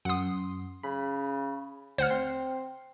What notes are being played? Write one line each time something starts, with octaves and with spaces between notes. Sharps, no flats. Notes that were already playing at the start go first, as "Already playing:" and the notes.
F#2 F#5 C6 D#6
C#3 B5
D2 C5 F#5 F6
C4 C6